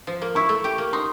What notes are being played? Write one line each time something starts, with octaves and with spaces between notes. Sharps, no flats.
F3
A#3
E4 C#6
A3
G4
A#3
D#4 C6